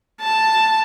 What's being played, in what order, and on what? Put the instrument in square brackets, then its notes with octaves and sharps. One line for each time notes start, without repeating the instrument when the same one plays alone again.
[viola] A5